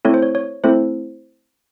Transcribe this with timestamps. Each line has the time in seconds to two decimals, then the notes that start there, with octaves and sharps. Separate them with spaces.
0.05 A3 C4 E4 A4 C#5
0.14 C5
0.22 C#5
0.35 C#5
0.64 A3 C4 E4 A4 C5